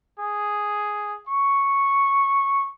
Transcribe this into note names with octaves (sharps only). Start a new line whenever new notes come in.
G#4
C#6